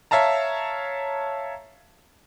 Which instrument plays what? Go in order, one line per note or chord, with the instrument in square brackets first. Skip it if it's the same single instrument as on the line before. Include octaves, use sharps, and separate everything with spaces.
[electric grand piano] C#5 E5 F5 A5 A#5